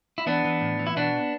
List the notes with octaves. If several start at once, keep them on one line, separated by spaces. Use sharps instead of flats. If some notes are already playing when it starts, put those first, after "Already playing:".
E4
E3 B3 D4
E3
A2
E3
E4
B2 B3 D4